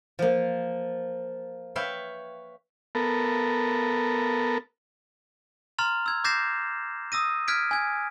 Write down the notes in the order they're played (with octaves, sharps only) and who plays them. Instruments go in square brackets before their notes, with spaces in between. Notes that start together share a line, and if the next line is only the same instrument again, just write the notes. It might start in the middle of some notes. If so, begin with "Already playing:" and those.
[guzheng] F3 A#3
B4 C#5 E5 F5 G5
[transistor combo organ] B3 A4 A#4
[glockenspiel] A#5 C6 F6 A6 F7
E6 G#6
D6 G6 A6 A#6 C7 E7
D#6 E6 A#6 D#7
F6 F#6 G#6 B6 D7
G#5 G#6